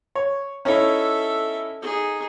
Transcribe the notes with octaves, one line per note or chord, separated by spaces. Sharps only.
C#5
C#4 D#4 E4 A4 E5
D#4 G#4